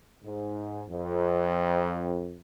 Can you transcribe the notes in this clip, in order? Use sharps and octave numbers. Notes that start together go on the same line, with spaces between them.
G#2
F2